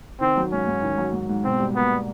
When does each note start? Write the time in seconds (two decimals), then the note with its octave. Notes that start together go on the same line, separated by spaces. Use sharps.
0.21 D#3 C4
0.37 F#3
0.52 G#2 C#4
0.67 G#2
0.83 D#3
0.98 F#3
1.13 G#2
1.29 G#2
1.44 B2 C4
1.60 G3
1.75 A#3 B3